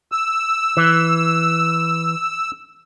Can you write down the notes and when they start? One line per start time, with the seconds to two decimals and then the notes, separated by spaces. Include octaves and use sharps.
0.12 E6
0.77 E3